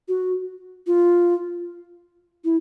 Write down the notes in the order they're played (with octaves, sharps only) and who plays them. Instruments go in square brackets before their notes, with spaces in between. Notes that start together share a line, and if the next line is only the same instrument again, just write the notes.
[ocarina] F#4
F4
E4